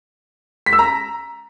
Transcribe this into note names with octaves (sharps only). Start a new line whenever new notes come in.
B6
E6
A#5